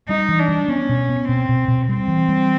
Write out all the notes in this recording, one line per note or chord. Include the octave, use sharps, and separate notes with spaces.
G3 D#4
E3
D4
G3
B3 C#4
B2
B3
B2 C4
B2
B2
G3 C4
E3
G3